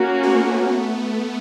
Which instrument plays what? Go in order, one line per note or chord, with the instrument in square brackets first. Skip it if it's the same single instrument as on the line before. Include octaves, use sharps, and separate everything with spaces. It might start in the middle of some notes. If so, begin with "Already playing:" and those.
Already playing: [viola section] A#3 C#4 F#4
[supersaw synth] A3 B3